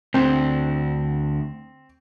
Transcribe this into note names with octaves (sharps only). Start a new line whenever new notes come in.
D2 C4